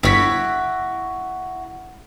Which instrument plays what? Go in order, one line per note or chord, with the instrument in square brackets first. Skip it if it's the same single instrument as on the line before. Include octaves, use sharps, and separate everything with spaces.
[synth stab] G1 B6 [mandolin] E4 F#4